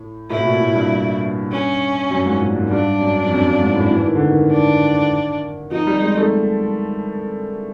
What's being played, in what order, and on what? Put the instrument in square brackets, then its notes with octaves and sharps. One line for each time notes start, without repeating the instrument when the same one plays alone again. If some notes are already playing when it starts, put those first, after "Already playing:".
Already playing: [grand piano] A2
[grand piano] A2 [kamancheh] E4
[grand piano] B2
A#2
A2
G2
[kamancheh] C#4
[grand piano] F#2
G#2
A#2
G#2
[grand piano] G2 [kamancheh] D4
[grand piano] F#2
F2
F#2
G2
G#2
A2
E3
D#3
D3
D#3
[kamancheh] D4
[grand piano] F3 [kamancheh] D#4
[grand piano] G3
G#3
A3